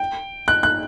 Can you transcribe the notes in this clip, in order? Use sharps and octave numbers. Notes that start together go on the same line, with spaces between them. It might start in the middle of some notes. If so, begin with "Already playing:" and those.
Already playing: G5
F#6
F#6